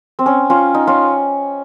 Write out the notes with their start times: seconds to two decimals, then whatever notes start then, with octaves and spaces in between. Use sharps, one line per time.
0.19 C4
0.26 C#4
0.50 C#4 F4
0.75 D#4
0.87 C#4 F4